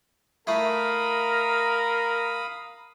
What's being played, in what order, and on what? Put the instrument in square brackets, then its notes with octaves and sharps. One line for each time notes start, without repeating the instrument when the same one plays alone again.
[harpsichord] A3 E4 [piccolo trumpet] A#4 [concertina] F5 B5 D#6